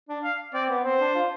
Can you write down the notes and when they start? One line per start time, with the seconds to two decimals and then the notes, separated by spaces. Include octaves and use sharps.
0.09 D4
0.24 F5
0.54 C4 D5
0.69 B3
0.84 C4 C5
1.00 D4
1.15 F4